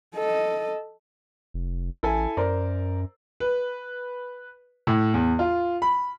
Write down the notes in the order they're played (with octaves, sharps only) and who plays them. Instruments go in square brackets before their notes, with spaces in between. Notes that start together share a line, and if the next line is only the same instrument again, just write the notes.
[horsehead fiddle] A4 D#5
[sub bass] F1
[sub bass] A1 [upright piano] E4 A4 G#5
[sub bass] F#2 [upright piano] A#4 C5 D5
[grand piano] B4
A2
E2
F4
B5